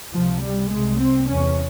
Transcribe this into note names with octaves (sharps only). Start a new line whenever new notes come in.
C#2 C3 F3
G3
C2 C3 G#3
C4
E2 C3 C#4